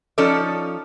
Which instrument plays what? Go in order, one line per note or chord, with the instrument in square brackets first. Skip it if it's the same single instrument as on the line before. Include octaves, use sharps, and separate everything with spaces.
[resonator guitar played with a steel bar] F3 C#4 D#4 A4 D5